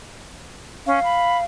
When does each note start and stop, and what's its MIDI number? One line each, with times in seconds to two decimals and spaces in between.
0.87 0.99 61
0.87 1.45 77
1.04 1.37 83